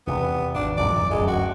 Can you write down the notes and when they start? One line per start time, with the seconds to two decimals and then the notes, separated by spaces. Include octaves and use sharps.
0.07 E2 C3 B3
0.55 G#1 D4
0.77 F2 E3 F#3 D5
1.10 D1 F#2 A2 G#3
1.27 F#4